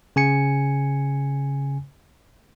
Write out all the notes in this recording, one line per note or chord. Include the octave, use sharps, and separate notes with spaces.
C#3 G#5 C#7